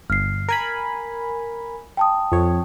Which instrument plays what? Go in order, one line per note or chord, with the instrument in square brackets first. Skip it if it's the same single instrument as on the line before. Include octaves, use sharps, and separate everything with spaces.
[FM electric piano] G1 [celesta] F6 C7
[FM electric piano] A#4 G#5 B5
[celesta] G5 A5 D#6
[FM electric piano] F2 C#5